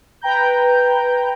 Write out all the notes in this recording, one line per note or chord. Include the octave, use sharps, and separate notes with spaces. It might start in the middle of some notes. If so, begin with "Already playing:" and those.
B4 G5 A#5 G6